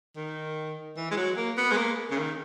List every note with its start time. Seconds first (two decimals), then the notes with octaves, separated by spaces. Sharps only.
0.16 D#3
0.97 E3
1.11 G#3
1.17 F#3
1.37 A#3
1.57 B3
1.71 G#3
1.77 A#3
2.10 C#3
2.18 D#3